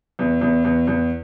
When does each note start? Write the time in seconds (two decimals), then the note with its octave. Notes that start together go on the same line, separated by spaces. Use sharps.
0.19 E2
0.41 E2
0.64 E2
0.87 E2